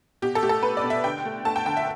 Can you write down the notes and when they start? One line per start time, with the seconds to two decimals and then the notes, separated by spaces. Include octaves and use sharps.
0.22 B2 G4
0.35 A4
0.43 A3 G4
0.49 A4
0.63 A3 B4
0.77 D5
0.83 B2
0.90 E5
1.04 D3 G5
1.25 A3
1.45 A3 A5
1.56 G5
1.66 D3 G5
1.77 E5